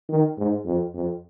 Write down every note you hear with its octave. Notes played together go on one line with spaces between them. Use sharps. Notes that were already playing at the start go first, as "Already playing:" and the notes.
D#3
G#2
F2
F2